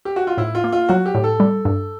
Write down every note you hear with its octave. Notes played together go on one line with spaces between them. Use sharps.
G4
F#4
F4
A2 E4
F4
A#3
F4
F#3 F#4
G4
A2
A4
G3
G2